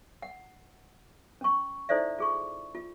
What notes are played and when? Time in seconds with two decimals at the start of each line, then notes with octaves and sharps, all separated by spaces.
0.22 F#5
1.41 C#4 C#6
1.89 D#4 E4 A4 C5 D5 E5
2.19 F4 G#4 C#6
2.75 F4